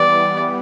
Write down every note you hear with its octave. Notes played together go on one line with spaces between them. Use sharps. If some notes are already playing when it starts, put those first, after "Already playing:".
Already playing: E3 G3 B3 D5